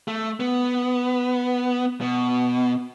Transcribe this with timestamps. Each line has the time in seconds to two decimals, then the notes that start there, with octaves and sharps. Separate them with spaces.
0.08 A3
0.40 B3
2.01 B2